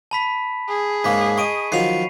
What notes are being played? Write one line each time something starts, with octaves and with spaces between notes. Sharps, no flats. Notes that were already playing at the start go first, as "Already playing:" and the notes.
A5 B5 B6
G#4
G#2 A#3 C#4 B6
D#5 C#6 D7 D#7
D#3 F3 F#3 C7 F7